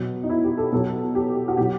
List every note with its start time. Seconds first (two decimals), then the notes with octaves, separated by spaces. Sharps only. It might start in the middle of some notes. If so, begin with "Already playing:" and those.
Already playing: B2 F#3
0.23 D#4
0.29 E4
0.44 G4
0.58 A4
0.72 B2 F#3 A4
1.15 G4
1.48 F#4
1.57 B2 F#3 G4